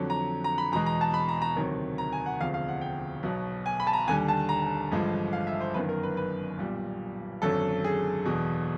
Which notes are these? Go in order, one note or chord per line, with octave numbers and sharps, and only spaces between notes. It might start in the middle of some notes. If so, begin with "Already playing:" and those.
Already playing: F2 D3 F#3
A#5
A#5
B5
E2 B2 G#3 A#5
A#5
A5
B5
A#5
A#5
D2 C3 D#3 F#3
A#5
G#5
F#5
E1 D2 C3 F3 F5
F5
F#5
G5
B1 B2 F#3
G#5
B5
A5
A#5
D#2 D3 G3 G#5
A5
A#5
A1 G2 D3 F3 G#3
F5
E5
C5
G1 F#2 D#3 B4
A#4
B4
B4
B1 A#2 G3
G#1 F#2 D3 F#3 A4
G#4
E1 E2 B2